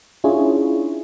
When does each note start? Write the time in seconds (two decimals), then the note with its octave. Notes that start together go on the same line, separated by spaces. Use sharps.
0.24 C#4 D4 E4 F4 G#4 C#5